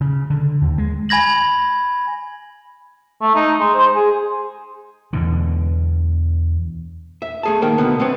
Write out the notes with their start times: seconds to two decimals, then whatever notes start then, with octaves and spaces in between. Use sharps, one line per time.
0.01 C#3
0.30 D3
0.62 D#2
0.78 G#3
1.09 G#5 B5 G#6 A#6 F#7
3.22 A3
3.35 D#4
3.60 G#3
3.74 C5
3.95 G#4
5.13 E2 B2 D3
7.22 E5
7.43 A3 G#4 A5
7.62 D#3 A#3 A#4 G5 A5
7.78 B2 D3 B3
7.99 A3 B3 C4 B4 C#5